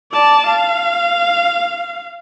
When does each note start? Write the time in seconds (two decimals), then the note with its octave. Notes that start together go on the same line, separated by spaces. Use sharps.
0.12 D5 A5
0.47 F5